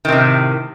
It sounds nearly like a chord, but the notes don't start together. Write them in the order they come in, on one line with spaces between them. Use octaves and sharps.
D#3 C3 A2